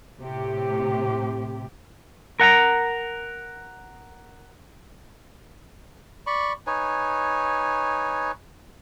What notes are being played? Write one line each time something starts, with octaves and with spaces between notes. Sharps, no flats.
A2 C3 G4
A#4 F#5 A5 A#5
D5 B5 C#6
D#4 B4 C#5 G#5